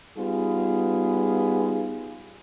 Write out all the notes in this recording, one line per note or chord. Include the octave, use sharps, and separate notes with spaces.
G3 B3 D#4 F4 G#4